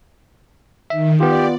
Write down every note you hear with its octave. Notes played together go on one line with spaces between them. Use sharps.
D#3 E5
B3 F4 G4 D5